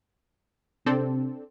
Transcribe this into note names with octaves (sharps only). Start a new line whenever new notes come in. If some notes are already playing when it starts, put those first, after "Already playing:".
C3 C4 D4 A4